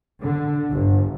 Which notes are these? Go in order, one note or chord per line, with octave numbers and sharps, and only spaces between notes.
D3
G1